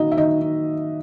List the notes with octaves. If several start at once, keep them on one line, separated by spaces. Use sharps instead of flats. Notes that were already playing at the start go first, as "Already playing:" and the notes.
Already playing: D#3 A#3 D#4 F#4 D#5
E5
D#3 D#4 D#5
D#4